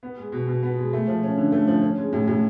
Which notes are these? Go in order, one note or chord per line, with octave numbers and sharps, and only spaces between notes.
B3
G#3
B2
B2
B3
G#3
A3
F3
C#4
D3
A3
F3
C#4
G#3
A2
A2